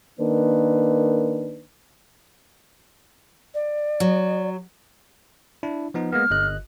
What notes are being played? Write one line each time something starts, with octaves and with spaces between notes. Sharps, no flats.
D#3 A#3 D4 B4
D5
F#3
D4 E4
F3 B3 D#4
G#3 A#3 B3 F6
G1 D#5 F#6